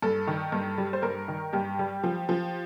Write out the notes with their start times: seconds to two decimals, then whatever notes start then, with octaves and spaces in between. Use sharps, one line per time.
0.02 G2 A4
0.27 D#3
0.52 G2
0.78 G3
0.93 C5
1.02 G2 A#4
1.28 D#3
1.53 G2 G4
1.79 G3
2.03 F3
2.29 F3